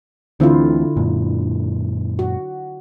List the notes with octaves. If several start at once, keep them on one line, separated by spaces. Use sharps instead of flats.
D2 D3 E3 C4 E4 F4
F#2 A#2
F#4